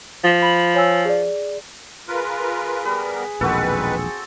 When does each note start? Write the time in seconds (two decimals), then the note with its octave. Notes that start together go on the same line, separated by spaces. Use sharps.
0.24 F3
0.42 B5 F#7
0.75 C#5 G#5 E6
1.05 G#4 D5
2.08 F4 G#4 A#4 B4
2.85 G3 B3 A#4 B4
3.41 E1 A#1 D#3 C4 F#4 A4 B4